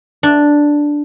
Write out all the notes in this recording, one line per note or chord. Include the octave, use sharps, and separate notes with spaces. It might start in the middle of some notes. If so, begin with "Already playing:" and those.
D4